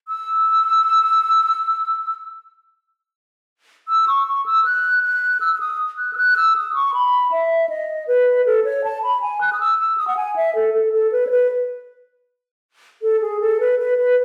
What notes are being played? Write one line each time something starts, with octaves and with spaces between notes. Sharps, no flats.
E6
E6
C#6
C#6
E6
F#6
F#6
E6
E6
D#6
F#6
E6
F#6
E6
D#6
C#6
B5
E5
D#5
B4
A4
C#5
A5
B5
G#5
F#6
D#6
E6
E6
D#6
F#5
G#5
E5
A4
A4
A4
B4
C#5
B4
A4
G#4
A4
B4
B4
B4